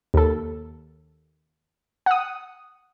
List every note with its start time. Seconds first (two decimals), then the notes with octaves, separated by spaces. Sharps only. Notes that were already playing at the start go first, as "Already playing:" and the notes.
0.14 D#2 A4
2.06 F#5 D#6